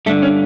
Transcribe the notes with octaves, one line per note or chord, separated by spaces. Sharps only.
G2 D3 A3
C#4